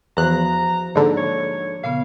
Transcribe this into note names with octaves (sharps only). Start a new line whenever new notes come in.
E2 F3 F#4 C5 A#5 F#6
G#2 D3 A#3 D5
C#5
A#2 C#3 B3 F5